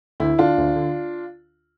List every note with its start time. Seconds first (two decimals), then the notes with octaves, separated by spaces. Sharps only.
0.20 D2 E4
0.39 D3 D4 F4
0.58 D2
0.76 D3